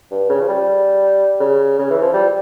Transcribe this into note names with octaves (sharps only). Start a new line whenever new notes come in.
G2
C#3
F3
G3
C#3
C#3
E3
F3
G3